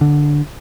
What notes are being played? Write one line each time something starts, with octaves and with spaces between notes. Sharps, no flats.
D3